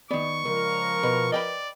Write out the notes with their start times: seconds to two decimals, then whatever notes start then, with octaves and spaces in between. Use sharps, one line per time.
0.11 D#3 B3 D5 C#6
0.45 C#2 F3 A#4
1.03 B2 B4
1.32 D5 D#5 G5 B5